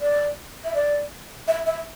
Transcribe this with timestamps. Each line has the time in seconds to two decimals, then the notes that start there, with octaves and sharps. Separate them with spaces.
0.01 D5
0.64 E5
0.74 D5
1.48 E5
1.66 E5